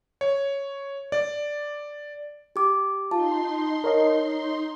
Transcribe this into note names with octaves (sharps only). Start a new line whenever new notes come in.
C#5
D5
G4 D6
D#4 F4 A5 C6
A#4 C#5 D#5